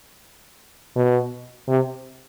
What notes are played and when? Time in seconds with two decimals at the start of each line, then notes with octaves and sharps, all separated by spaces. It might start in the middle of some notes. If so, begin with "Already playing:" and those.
0.96 B2
1.68 C3